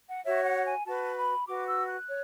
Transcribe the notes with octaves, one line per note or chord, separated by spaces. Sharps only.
F#5
F#4 C#5 E5
F#5
G#5
F#4 B4 A5
B5
F#4 B4 D6
E6
F#6
C#5